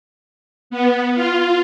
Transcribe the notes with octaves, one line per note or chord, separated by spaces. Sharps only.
B3
F4